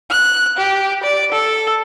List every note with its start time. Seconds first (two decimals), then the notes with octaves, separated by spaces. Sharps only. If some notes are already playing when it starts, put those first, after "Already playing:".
0.11 F#6
0.57 G4
1.03 D5
1.32 A4